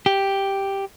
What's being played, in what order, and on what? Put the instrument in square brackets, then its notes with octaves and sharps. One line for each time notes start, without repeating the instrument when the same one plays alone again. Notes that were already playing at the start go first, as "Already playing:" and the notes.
[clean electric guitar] G4